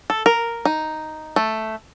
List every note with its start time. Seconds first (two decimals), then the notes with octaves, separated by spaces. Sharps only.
0.10 A4
0.26 A#4
0.65 D#4
1.36 A3